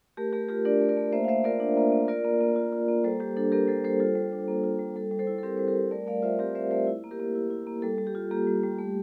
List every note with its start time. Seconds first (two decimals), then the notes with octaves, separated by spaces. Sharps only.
0.17 A3 G4 A#4
0.33 A3 G4 A#4
0.49 F4 G4 A#4
0.65 D4 A#4 D5
0.81 A3
0.89 A#4 D5
0.97 A3
1.12 A#3 C5 E5
1.24 F5
1.28 A#3 C5 E5
1.44 F4 A#4 D5
1.60 D4
1.77 A#3
1.92 A#3
2.08 F4 A#4 D5
2.25 A#3
2.41 A#3
2.56 F4
2.73 F4
2.89 A#3
3.04 G3 A4 C5
3.20 G3 G4
3.37 D4 A4
3.52 A#3 G4 A#4
3.68 G3 A4 C5
3.84 G3 A4 C5
4.00 F4 A4 C5
4.15 G3
4.32 D4
4.48 A#3
4.63 F4
4.79 G3
4.96 G3 A4
5.11 G3
5.19 A4 C5
5.27 E4
5.38 A4
5.43 C4 G4 A#4
5.57 G3 C5
5.68 G4 A#4
5.76 G3
5.91 A3 A#4 D5
6.07 A3 D5 F5
6.23 F4 C5 E5
6.39 C4 G4 A#4
6.55 A3 C5 E5
6.71 A3 C5 E5
6.87 E4
7.04 A#3
7.11 G4 A#4
7.20 A#3
7.35 E4
7.50 E4
7.67 A#3
7.82 G3 A4
7.98 G3
8.07 G4
8.15 F4
8.31 A#3 G4
8.47 G3
8.63 G3
8.79 A3